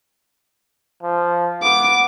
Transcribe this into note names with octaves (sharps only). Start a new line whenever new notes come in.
F3
B3 D6